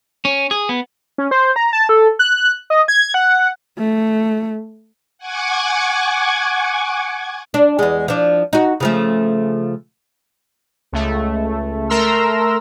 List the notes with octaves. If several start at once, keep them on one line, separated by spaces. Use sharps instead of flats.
C#4
G#4
B3
C#4
C5
A#5
A5
A4
F#6
D#5
G#6
F#5
A3
F#5 G#5 C#6 D6 G#6
D4
E2 G#3
F3 D4
D#4 F#4
C#3 F3 A3
C#2 A3
A3 A#4 A#5 C6 E6